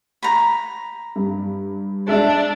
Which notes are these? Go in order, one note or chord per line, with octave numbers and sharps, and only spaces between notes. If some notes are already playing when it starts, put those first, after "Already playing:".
A#5 B5
G2
G#3 D4 E5